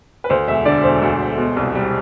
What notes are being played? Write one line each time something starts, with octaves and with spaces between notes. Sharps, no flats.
B4
D2 C5
E1 E5
D3 D5
E1 C5
D2
E1
B2
C2
G3